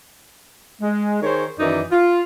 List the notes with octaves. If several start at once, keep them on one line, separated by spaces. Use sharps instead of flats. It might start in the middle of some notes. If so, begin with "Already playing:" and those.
G#3
D#3 G#4 C5 C#5
F#2 D#3 E3 D#4 D5
F4